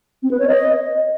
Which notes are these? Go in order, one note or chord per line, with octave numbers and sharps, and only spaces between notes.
C4
B4
C#5
D#5